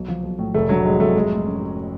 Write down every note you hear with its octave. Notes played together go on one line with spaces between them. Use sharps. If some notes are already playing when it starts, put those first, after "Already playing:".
Already playing: B1
F3
B1
A2
F1 A3
D3 F#3
F#3 G#3
F2 A3
G#2 G#3
A3
C#4
F#3